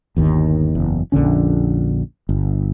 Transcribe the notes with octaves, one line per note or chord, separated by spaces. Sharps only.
G1 D#2 D#3
F#1 E2
A#1 F2 D3 C#4
G1